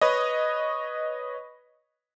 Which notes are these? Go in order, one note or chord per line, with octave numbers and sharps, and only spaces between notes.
B4 C#5 D#5